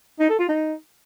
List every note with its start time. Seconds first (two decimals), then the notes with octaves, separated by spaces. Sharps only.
0.20 D#4
0.29 A4
0.39 F4
0.49 D#4